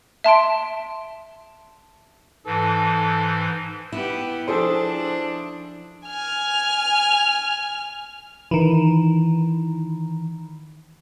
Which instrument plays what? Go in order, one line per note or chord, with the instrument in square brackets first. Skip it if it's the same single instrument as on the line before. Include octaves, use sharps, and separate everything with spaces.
[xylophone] E5 A5 C6 D7
[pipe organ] G#2 E3 [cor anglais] A4
[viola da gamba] B3 G4 [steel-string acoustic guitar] E4
[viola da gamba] F3 D4 [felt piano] G#4 A4 C5
[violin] G#5 F6
[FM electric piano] D#3 E3